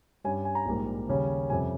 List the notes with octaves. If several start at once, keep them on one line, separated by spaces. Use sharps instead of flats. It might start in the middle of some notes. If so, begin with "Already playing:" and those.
G2 G3 C#4 G#5
G#5
A#5
A#1 G#2 G3 A#3
D#2 C#3 G3 C#4
F2 C3 G3 C#4 G#5